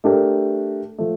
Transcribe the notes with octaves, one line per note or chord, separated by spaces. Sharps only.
A3 D4 G4 A#4
F3 A3